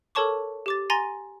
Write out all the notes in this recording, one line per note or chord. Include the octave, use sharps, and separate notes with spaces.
A4 A#4 C#5 A5 C#6 D6
G4 D6 A6
G#5 A#5 C6 A6 A#6 D#7